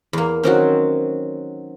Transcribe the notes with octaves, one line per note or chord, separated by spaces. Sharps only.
E2 A#3
D#3 F#3 C4 C#4 F#4